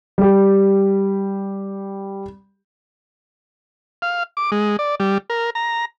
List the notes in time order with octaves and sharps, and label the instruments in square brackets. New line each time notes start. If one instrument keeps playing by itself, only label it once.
[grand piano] G3 G4
[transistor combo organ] F5
D6
G#3
D5
G3
A#4
A#5